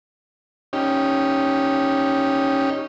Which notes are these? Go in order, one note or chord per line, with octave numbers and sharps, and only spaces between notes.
C#4 D#4 G4